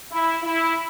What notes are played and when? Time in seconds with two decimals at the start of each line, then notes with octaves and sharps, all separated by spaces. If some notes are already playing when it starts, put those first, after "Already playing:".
0.12 E4
0.43 E4